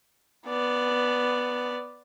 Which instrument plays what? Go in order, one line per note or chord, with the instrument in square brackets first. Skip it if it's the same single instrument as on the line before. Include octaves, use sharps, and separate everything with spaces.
[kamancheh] B3 D5